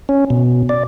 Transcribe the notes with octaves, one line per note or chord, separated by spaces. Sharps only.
C#4
B2
D5